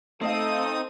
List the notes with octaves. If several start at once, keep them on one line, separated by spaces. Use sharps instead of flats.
A3 C4 D#4 A4 D#5 F5 D#6